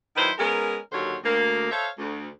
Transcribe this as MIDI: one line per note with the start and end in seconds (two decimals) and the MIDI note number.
0.16 0.29 51
0.16 0.29 54
0.16 0.29 64
0.16 0.29 71
0.16 0.29 72
0.37 0.77 56
0.37 0.77 59
0.37 0.77 61
0.37 0.77 70
0.91 1.16 39
0.91 1.16 50
0.91 1.16 54
0.91 1.16 72
0.91 1.16 73
1.24 1.67 38
1.24 1.67 58
1.71 1.87 69
1.71 1.87 72
1.71 1.87 73
1.71 1.87 76
1.71 1.87 77
1.97 2.27 38